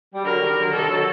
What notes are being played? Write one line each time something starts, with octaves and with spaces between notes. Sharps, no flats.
G3
D3 F#3 A#4
D#3 G3
D3 F#3
C3 D#3 A4
D3 F#3